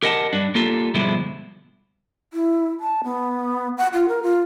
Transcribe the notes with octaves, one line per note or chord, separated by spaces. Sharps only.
G4 A#4 D#5 F#5 G#5 A5
G2 D4
A#3 F4 G4 A4
G2 B2 D3 F3 G#3 E4
E4
A5
B3
F#5
F4
A#4
F4